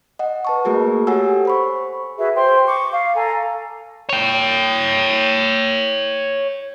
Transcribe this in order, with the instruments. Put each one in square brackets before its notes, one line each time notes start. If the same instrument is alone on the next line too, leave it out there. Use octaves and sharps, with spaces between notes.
[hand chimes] D#5 F#5
B4 A5 C#6
A3 A#3 F#4 G#4 A#4
G4 A4 C#5 F#5 G#5 E6
C5 B5 C#6
[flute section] F#4 G#4 B4 E5
C5 G5 C6
C#6 D6
F5 C#6
A4 G#5 A#5
[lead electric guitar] C#5 G5